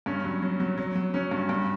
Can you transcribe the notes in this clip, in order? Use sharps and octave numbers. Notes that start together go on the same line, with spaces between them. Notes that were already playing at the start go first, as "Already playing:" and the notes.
G2 C#4
F#3
F#3
F#3
F#3
F#3
F#3 C#4
G2
G2